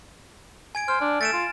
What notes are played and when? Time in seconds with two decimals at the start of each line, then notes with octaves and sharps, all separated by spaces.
0.75 G#5 G#6 D7
0.88 C5 F6
1.01 D4
1.21 A3 A6 D7 E7
1.33 F4